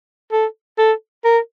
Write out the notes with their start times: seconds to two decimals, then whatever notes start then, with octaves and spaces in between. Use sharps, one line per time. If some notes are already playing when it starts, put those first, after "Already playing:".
0.32 A4
0.78 A4
1.25 A#4